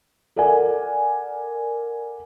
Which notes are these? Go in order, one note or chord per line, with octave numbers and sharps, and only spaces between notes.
A4 A#4 D5 F#5 G#5